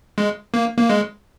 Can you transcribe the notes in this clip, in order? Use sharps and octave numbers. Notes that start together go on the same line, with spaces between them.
G#3
A#3
A#3
G#3